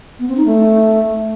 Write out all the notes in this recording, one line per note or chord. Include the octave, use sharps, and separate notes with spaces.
B3
C4
D#4
A3